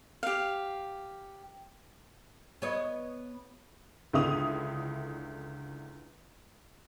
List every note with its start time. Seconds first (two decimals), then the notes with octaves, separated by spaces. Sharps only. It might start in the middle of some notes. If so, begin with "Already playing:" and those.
0.23 G4 F5
2.62 B3 C#5 D#5
4.13 C#2 D3 E4 D#6 F7